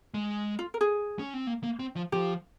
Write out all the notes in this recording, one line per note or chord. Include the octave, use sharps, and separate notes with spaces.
G#3
F4
A#4
G#4
C#4
C4
A#3
A#3
C4
F3
F3 G4